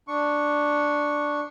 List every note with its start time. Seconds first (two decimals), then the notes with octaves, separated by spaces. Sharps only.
0.08 D4 C#6